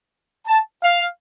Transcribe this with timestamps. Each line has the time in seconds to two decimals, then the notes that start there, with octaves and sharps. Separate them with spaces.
0.47 A5
0.83 F5